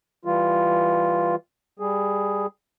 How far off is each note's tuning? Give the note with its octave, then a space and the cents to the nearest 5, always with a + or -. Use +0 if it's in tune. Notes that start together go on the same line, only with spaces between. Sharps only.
E3 +0 G3 +0 F4 +0
G3 +15 G#4 +0